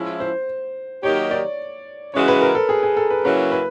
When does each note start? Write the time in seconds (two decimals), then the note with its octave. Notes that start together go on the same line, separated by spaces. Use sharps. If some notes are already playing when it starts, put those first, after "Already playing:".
Already playing: F3 G#3 C#4 E4
0.20 C5
1.03 D#3 F#3 A#3 D#4 G4 C#5
1.31 D5
2.13 C#3 E3 G#3 C#4 F#4 C#5
2.28 B4
2.42 A#4
2.55 A4
2.69 G#4
2.83 G#4
2.97 A4
3.10 B4
3.24 C#3 F#3 A#3 C#4 E4 B4
3.52 B4